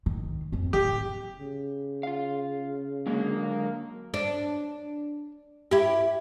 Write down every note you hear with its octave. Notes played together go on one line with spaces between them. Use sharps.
D#3
F2 C4
A1 D3 G4
C#3
F4 F5
D3 F#3 G#3 A#3
D4
E4 G4